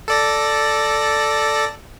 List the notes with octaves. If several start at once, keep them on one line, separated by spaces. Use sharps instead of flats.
A4 D5 A#6